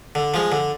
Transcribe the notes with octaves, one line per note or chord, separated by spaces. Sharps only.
D3
F3 G#3
D3